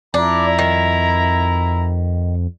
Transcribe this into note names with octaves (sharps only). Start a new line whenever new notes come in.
F2 D4 E4 A#5
D#3